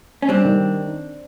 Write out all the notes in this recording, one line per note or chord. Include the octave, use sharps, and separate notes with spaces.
C#4
G3 C4 D4
D#3